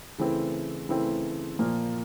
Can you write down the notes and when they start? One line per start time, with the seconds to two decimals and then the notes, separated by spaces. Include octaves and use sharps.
0.18 C#3 E3 A3 C4 E4
0.89 C#3 E3 A3 C4 E4
1.59 A#2 F3 A#3